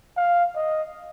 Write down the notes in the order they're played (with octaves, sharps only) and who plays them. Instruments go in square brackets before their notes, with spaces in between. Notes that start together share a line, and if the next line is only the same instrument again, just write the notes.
[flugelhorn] F5
D#5